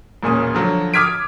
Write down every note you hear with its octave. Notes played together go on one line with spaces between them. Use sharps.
E1 A#2 C#4 D#6
D3 F3 F#3
D6 D#6 F6 G#6 B6 D7